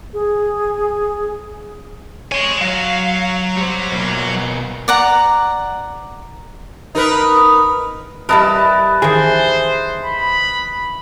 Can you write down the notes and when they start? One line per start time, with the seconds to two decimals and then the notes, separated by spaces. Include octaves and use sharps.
0.14 G#4
2.32 F2 C#5 G#5 C6
2.61 F#3 F5
3.57 G3 C5
3.92 B2 A#3
4.88 D5 F#5 A#5
6.95 D#4 A#4 B4
8.29 G3 E4 A#4 B4 D#5 A5
9.02 D#3 E3 G#4 C5
10.04 B5